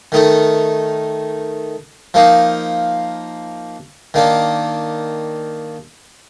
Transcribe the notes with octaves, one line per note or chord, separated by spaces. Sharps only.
D#3 A3 D#4
F3 A#3 D#4
D#3 A#3 D4